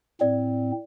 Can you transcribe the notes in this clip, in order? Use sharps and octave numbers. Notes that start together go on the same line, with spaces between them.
A2 C4 D5